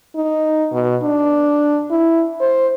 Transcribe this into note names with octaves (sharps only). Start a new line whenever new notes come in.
D#4
B2
D4
E4
C5